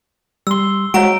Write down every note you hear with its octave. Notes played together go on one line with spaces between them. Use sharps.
G3 C6 E6 G7
G#3 F#4 C#5 F5 F#5 A#5 D7